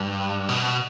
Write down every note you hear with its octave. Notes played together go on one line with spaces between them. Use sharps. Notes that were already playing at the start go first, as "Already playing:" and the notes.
Already playing: G2
B2